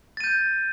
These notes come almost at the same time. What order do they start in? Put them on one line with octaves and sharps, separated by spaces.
A6 D#7 G6